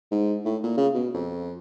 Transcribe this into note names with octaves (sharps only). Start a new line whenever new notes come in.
G#2
A2
A#2
C#3
B2
F2